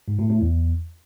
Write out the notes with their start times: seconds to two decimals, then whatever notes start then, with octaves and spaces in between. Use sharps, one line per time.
0.08 G#2
0.19 A2
0.30 A2
0.41 E2